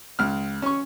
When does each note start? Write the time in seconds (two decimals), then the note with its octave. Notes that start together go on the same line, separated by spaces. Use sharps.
0.19 C#2 F6
0.62 C#4 C#6